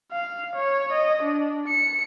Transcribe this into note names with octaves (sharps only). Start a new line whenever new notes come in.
F5
C#5
D#5
D4
C#7